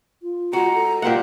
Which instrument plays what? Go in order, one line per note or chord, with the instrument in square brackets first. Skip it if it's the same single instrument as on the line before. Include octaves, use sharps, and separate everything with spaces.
[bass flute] F4
[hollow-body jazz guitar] G#3 F#4 [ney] A#5
[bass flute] A4
[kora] A#2 C5 F#5 [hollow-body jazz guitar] A#3 G4